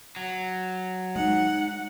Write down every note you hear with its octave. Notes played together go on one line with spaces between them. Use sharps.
F#3
G#3 D#4 F#5